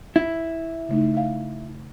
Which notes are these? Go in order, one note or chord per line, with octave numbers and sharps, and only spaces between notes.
E4
C#3 A3 D#4
E5 F5